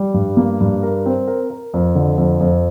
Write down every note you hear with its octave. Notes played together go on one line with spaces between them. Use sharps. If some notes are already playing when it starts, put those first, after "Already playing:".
Already playing: G3
G2
A#3
G2
A#4
C4
A#4
A#4
F2
D3
F2
F2